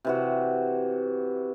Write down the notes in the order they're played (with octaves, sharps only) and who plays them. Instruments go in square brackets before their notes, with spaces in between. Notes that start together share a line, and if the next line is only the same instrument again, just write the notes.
[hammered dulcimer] C3 E3 F#4